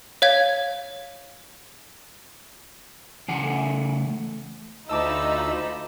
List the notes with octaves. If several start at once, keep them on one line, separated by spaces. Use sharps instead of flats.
C#5 F5 G#6
C#3 E3 F#5
A3
D2 D#4 F4 D#5 A5 B5 D6 E6